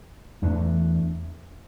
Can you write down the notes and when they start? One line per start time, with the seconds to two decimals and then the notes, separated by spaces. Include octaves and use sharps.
0.42 E2 E3 A3 D4